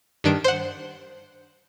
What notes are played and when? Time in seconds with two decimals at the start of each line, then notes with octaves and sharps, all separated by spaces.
0.24 G2 D#3 D4 D7
0.44 C5 F#5